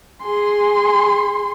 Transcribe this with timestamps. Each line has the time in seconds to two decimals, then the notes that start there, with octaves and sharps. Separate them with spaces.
0.23 G#4 C6